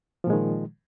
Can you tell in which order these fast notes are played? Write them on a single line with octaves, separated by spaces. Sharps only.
F3 A#2 G#3 D#3